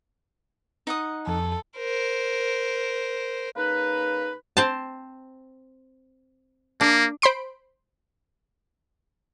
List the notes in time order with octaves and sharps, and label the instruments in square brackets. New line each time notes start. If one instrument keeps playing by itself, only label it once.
[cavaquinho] D#4 F#5 D#6
[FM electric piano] F2 [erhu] A4
[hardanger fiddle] A#4 C5
[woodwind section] C#3 A#3 D#4 B4
[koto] C4 C5 A5
[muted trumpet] A#3 [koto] D4
[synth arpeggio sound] C5 B5 C6 D7